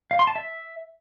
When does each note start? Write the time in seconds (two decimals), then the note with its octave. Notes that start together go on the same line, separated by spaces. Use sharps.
0.11 F5
0.19 C6
0.27 A5
0.36 E5